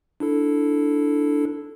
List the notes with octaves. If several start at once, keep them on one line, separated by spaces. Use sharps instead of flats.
D4 E4 A4